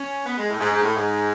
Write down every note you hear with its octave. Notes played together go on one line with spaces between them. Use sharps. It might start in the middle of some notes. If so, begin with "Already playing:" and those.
Already playing: C#4
B3
G#3
A2
G#2
G#2
A2
G#2